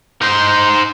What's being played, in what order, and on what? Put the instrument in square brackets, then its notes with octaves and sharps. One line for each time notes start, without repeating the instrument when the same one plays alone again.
[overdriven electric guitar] D#4 C5